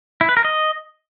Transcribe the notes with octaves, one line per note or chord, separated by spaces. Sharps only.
E4
B4
A#4
D#5